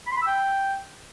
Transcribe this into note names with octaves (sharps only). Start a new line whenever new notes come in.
B5
C6
B5
E6
G5